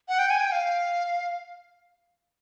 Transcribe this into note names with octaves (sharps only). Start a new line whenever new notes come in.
F#5
G5
G#5
G5
F5